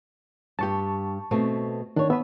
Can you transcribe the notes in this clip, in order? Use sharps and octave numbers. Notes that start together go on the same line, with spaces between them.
G2 G4 A5 C#6
B2 A3 C4
D#3 D4 C#5
B3 B4 E5